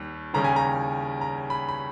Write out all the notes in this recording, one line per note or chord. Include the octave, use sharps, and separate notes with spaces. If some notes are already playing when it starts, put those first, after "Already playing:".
Already playing: D#2 G3
D#2 C#3 G3 C#4 A#5
G#5
A#5
A#5
B5
B5